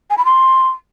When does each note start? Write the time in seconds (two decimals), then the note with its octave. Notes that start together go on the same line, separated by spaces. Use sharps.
0.10 G#5
0.18 B5
0.25 C6